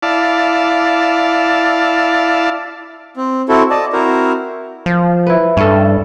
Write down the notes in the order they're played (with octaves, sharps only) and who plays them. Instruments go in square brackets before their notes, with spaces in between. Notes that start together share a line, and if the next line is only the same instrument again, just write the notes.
[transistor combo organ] E4 D5 F5 A5
[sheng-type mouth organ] C4
C4 E4 F#4 A4
D5 D#5 A5
C4 E4 F#4 A#4 C5
[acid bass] F3
[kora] E4 B4
[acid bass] G2 [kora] C#4 A4